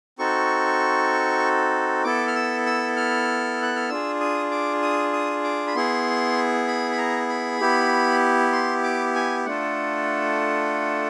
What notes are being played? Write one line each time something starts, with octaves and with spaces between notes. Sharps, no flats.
C4 D#4 F#4 A4 C#6
B3 E4 A4 D6
F6
E6
E6
F6
F#6
F6
D4 F4 G#4 E6
D#6
D6
D#6
D#6
D6
B5
B3 E4 G#4 C6
B5
B5
A#5
B5
B3 E4 G4
C6
D6
G#5
A3 D4 F4 A4 F#5